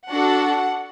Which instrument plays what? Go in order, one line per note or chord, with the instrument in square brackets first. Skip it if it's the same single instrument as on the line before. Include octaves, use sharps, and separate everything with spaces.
[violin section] D4 F#4 A4 F#5